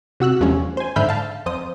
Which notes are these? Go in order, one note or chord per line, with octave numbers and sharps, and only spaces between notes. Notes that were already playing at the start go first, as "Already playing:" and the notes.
C3 F#4 E6 F#6
E2 F3 G3 A3 C#4
C5 G#5
G#2 D3 E5 B5 F6 G6
F5 A5
F2 C5 D#6